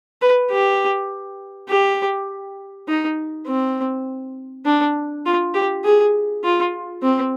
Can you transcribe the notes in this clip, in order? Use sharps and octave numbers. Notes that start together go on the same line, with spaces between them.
B4
G4
G4
D#4
C4
D4
F4
G4
G#4
F4
C4